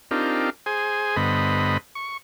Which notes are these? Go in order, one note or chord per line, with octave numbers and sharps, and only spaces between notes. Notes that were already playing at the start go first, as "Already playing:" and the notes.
C4 D4 D#4 F4 G4 A#4
G#4 C5 G#5
G2 D3 B3 C5 D#5 B5
C#6